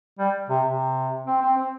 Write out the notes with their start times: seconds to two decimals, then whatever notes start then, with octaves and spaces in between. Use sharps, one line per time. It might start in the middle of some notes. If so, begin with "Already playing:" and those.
0.19 G3
0.49 C3
0.65 C3
1.27 C4
1.42 C4
1.57 C4